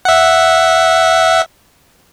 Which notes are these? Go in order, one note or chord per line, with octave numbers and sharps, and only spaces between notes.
E5 F#5